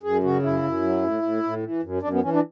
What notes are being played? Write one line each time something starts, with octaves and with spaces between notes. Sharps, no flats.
F#2 G#4
C#3 F#4
F#2 E4
F#2
F#3
A2
A2
A2
E3
F#2
F#2 D4
B3
E3 C#4
D4